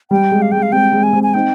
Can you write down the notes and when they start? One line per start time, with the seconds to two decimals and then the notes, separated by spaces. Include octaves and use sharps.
0.11 G3 G5
0.32 G#3
0.42 F5
0.52 G#3 G5
0.62 F5
0.72 G#3 C4 G5
0.93 G#3 C4
1.03 G#5
1.13 G#3 C4
1.23 G#5
1.34 C4 D#4 G5